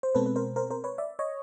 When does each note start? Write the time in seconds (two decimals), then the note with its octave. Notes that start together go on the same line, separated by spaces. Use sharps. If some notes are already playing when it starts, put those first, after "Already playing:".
0.03 C5
0.15 B2 G#3 C4 A4 B4
0.26 B4
0.36 A#4 C5
0.56 A#4 C5
0.71 A#4 C5
0.84 B4 C#5
0.98 D5 E5
1.19 C#5 D#5